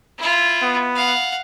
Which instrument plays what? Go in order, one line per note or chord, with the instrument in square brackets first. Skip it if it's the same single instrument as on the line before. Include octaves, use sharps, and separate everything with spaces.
[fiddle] E4 F4
[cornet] B3
[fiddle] F5 F#5